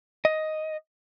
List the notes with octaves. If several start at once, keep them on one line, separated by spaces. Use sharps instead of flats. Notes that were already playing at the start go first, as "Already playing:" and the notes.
D#5